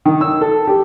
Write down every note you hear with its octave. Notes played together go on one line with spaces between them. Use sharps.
D#3
E6
A4
G4